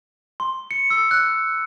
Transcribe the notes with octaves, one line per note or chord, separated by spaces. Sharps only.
C6
C#7
E6
F#6